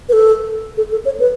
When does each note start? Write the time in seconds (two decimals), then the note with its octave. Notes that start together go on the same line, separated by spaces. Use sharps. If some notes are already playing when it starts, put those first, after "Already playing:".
0.09 B4
0.13 A4
0.77 A4
0.92 A4
1.05 C#5
1.20 B4